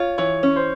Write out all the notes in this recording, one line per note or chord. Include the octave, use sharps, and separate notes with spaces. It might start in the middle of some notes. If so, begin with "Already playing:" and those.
Already playing: F4 C#5
E3 C#5
C#4
C5